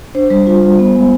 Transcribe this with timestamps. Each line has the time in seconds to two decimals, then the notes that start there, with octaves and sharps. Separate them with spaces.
0.15 D4 C5
0.30 G3
0.47 F4
0.63 G3
0.79 B3
0.95 G#3